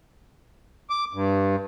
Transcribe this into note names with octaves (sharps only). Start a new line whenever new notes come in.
D6
G2